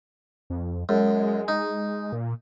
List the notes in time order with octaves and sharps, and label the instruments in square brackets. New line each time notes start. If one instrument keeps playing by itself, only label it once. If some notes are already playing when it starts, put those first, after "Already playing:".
[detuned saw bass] F2
[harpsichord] F#2 [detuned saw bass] G#3
[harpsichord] D#4
[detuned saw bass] A#2